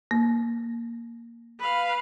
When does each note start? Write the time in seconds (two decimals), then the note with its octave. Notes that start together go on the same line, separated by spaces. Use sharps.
0.11 A#3
1.60 B4 F5